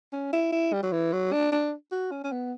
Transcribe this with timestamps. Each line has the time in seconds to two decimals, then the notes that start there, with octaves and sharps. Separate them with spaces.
0.13 C#4
0.33 E4
0.52 E4
0.73 G3
0.83 F#3
0.92 E3
1.13 F#3
1.32 D4
1.52 D4
1.92 F#4
2.11 C#4
2.24 C#4
2.32 B3